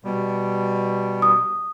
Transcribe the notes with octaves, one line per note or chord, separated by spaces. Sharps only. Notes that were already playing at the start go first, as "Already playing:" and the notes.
B2 G3
D#6